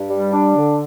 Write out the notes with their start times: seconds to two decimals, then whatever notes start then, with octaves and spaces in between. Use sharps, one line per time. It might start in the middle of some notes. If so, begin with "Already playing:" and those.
Already playing: G2
0.09 G3
0.32 D4
0.56 D3